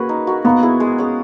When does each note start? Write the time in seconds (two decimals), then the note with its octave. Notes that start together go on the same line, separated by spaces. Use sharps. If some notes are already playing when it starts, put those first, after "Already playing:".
Already playing: A#3 C#4 F#4 G#4 B4
0.09 D#4
0.27 F#4 A#4
0.45 A#3 B3
0.62 E4 G#4
0.80 G#3
0.98 C#4 G#4